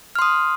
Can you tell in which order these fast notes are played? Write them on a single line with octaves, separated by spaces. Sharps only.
F6 C6 D#6